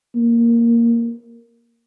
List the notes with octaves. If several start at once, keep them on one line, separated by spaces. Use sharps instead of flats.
A#3